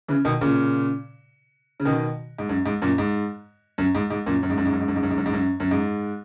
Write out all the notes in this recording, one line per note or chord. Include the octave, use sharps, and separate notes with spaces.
C#3 E3
B2 D#3
A#2 C#3
C#3
B2 D#3
G#2
F#2
G#2
F#2 A#2
G#2
F#2
G#2
G#2
F#2 A#2
F#2
G#2
F#2
G#2
F#2
G#2
F#2
G#2
F#2
G#2
F#2
G#2
F#2
F#2
G#2